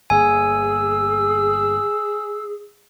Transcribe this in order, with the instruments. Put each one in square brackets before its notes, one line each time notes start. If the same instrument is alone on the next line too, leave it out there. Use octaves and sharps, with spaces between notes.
[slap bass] G1 A#3 [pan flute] G#4 [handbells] G#5 [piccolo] E6